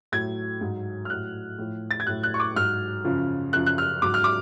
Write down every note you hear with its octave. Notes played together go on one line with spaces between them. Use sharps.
A2 F#3 G#6
G#2 F#3
F6
A2 F#3 F#6
A2 F3
A6
G#6
A2 F#3 F#6
F#6
C#6
D6
G#2 F#3 F6
F#2 C#3 F3
F#2 C#3 F3 F#6
F#6
F6
G#2 F#3 D6
F6
D6